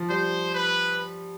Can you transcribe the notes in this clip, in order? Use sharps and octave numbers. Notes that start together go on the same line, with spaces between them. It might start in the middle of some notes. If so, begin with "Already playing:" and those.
Already playing: F3
G3 C5
B4